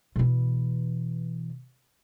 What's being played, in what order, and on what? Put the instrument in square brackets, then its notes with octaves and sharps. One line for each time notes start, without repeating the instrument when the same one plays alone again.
[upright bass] B2 E3